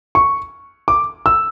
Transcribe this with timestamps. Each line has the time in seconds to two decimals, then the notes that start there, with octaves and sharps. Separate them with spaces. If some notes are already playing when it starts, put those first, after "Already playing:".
0.15 C#6
0.88 D6
1.26 E6